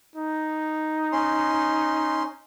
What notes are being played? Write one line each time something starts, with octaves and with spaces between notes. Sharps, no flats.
D#4
C#4 C6